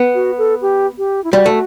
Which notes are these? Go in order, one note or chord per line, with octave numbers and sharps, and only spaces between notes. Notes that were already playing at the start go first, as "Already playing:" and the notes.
Already playing: B3
F#4
A4
G4
G4
E4
G3 F#4
A3